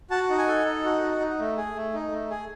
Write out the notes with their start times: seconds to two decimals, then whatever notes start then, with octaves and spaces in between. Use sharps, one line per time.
0.10 F#4 A5
0.30 D#4
0.38 G#5
0.47 A4
0.65 D#4
0.84 F#4
1.03 D#4
1.20 D#4
1.39 A3
1.57 G#4
1.76 A3
1.94 D#4
2.12 A3
2.31 G#4